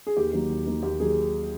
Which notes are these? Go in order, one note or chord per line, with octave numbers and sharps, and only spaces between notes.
G#4
D#2 G4
D#3 F#3 A#3
D#2
D#3 F#3 A#3
D#2 G4
D#3 F#3 A#3 G#4